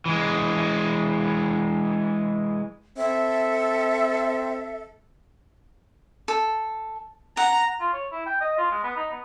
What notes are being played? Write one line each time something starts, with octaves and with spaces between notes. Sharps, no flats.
E3 G#3
C4 A4 E5
A4
F#5 A#5
F4
C#5
E4
G5
D#5
F4
G#3
B3
D#4
B3